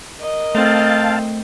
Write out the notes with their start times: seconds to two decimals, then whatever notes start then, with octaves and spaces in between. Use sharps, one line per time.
0.19 A#4 D#5
0.55 A3 C4 F5 A5